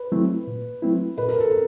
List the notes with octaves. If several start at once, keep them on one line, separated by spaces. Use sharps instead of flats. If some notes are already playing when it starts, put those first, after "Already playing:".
Already playing: B4
F#3 A3 C4 E4
A#2
F#3 A3 C4 E4
A#2 B4
A#4
A4
A#4